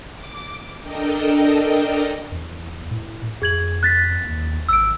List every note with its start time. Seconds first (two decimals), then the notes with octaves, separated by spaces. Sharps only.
0.12 D6
0.80 D4 A4 A#4 D#5 G5
2.32 E2
2.91 A2
3.42 F2 G#4 G#6 F#7
3.83 F#6 A6 B6
4.24 D#2
4.69 G#1 E6 D7